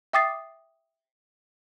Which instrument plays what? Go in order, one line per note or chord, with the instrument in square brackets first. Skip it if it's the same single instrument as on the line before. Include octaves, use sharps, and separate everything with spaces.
[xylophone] E5 G5 D6 D#6 A6 C7